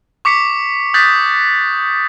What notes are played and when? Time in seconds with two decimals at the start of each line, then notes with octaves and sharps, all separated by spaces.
0.25 C#6 D6 B6 C#7
0.94 D#6 F#6 G6 A6 B6